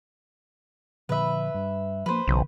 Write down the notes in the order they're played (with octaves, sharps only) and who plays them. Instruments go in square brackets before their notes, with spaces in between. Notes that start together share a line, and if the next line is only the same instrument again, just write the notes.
[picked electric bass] A#2 D3 F3 [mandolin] B4 E5
[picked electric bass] G2
[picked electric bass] F3 A#3 [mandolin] B4 C5
[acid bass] B1 [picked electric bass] C#3 E3